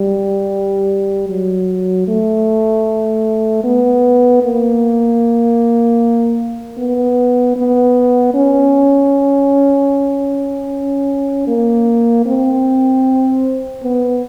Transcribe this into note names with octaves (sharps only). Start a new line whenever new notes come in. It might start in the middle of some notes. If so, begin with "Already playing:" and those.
Already playing: G3
F#3
A3
B3
A#3
B3
B3
C#4
A#3
C4
B3